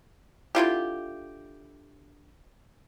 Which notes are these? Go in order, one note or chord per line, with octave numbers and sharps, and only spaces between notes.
D3 E4 F4 G4